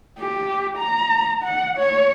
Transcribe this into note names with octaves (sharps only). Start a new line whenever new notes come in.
G4
A#5
F#5
C#5